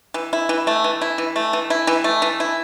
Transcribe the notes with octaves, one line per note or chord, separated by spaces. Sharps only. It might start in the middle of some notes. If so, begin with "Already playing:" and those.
E3
E4
E3
A3
E3
E4
E3
A3
E3
E4
E3
A3
E3
E4